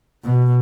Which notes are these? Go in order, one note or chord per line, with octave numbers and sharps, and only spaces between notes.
B2